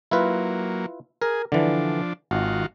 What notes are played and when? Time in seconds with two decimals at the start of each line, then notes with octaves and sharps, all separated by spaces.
0.11 F#3 A#3 E4 F4 B4
1.22 G#4 A#4
1.52 D3 E3 F3 D4
2.31 G#1 D#3 F4 F#4